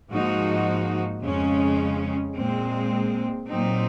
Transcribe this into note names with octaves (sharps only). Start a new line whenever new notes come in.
G#2 F3 A#3 D#4 F#4
F2 C#3 G#3 C#4
A#2 G#3 C4
A#2 F#3 C4 D#4